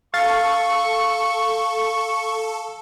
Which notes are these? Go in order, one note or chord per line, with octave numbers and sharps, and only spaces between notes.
A4 F5 C#6 A6